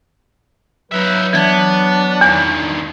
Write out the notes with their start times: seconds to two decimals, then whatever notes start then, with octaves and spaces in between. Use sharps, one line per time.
0.92 F#3 D#4 B4 E5
1.33 E3 B3 D4 G#6
2.21 E2 G2 D#3